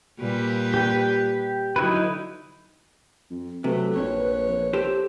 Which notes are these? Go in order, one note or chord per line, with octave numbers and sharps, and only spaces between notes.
A#2 G3 B4
G4 G5
D3 F#3 D#4 E4 B4
F2
C3 F#3 A3 B4
A#1 F2 C#5
G4 A4 C5